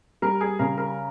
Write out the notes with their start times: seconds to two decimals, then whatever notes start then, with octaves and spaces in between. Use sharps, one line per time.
0.22 G3 A#4
0.41 G#4
0.59 C#3 A#4
0.78 A#4